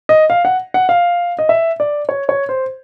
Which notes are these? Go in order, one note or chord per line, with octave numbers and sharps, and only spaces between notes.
D#5
F5
F#5
F#5
F5
D#5
E5
D5
C#5
C#5
C5